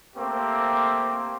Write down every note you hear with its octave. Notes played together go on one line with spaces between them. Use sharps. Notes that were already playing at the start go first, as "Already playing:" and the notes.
A3 A#3 C4 G4